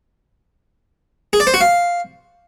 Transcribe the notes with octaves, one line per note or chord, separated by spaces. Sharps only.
G#4
D5
C5
F#4
F5